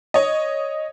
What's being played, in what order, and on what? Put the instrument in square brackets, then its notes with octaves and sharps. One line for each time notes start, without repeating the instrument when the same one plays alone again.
[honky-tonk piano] C#5 D#5